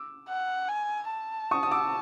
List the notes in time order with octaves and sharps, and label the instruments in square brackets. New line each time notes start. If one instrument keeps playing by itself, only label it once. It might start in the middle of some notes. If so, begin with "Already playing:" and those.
Already playing: [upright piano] D6 E6
[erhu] F#5
G#5
A5
[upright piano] C#6 D#6
D#6
D6 E6